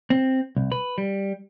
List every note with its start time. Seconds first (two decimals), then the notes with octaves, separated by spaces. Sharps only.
0.10 C4
0.57 C2
0.72 B4
0.98 G3